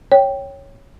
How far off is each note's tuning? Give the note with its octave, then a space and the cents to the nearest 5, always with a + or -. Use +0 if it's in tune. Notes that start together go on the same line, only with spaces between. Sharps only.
C#5 -5 G5 +0